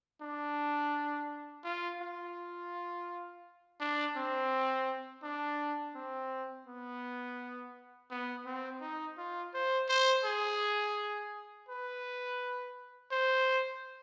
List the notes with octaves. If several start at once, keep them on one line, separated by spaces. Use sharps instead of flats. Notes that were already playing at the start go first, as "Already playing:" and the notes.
D4
F4
F4
D4
C4
D4
C4
B3
B3
C4
D#4
F4
C5
C5
G#4
B4
C5